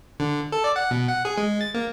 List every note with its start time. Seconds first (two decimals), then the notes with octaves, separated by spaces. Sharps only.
0.20 D3
0.52 A4
0.64 D5
0.76 F#5
0.91 B2
1.08 F#5
1.25 G#4
1.38 G#3
1.61 A6
1.74 A#3